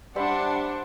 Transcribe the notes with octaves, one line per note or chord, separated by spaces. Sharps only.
G3 D4 C5 E5 F#5 B5